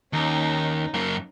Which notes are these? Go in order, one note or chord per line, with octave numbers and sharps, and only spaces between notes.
D#2 C#4 D#4
F#2 A#3